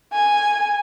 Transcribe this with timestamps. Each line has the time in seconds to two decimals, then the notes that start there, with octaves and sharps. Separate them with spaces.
0.13 G#5